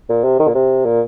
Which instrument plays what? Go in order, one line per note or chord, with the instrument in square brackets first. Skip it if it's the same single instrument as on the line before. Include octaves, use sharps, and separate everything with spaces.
[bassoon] A#2
C3
D#3
A#2
C3
A#2